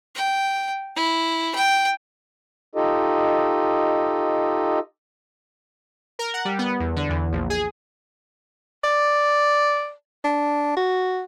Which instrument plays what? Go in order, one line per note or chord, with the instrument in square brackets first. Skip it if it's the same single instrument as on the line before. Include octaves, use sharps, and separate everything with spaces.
[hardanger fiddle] G5
E4
G5
[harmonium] D#4 F4 G4 A4 D#5
[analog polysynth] A#4
F#5
G3
B3
E2
D3
E2
A#1
G#4
[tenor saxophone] D5
D4
F#4